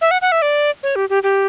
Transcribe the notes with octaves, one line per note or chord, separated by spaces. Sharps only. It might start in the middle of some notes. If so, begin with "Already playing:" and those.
E5
F#5
F#5
E5
D5
C#5
G4
G4
G4